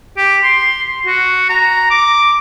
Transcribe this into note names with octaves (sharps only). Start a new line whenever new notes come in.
G4
C6
F#4
A#5
D6